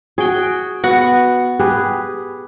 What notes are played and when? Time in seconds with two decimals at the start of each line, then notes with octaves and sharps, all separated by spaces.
0.18 F#4 G#4 G5
0.84 B3 F#4 F#5
1.59 G4 G#4 B4